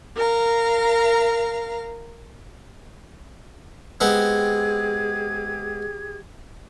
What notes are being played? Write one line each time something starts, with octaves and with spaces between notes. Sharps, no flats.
A#4 F5 A#5
G#3 B3 C4 G4 G#4 G#6